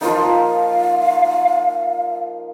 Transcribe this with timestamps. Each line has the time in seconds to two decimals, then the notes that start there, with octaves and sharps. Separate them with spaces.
0.01 F3 A#3 D#4 F5